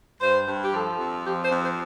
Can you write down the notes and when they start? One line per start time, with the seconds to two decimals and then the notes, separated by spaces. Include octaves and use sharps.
0.21 G2 C5
0.47 G2
0.62 G4
0.73 F3 A4
0.99 F2
1.25 F3 G4
1.42 C5
1.51 F2
1.60 C5